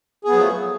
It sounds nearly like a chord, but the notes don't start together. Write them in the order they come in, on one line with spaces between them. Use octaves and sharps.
G#4 B3 F#3 F3 A3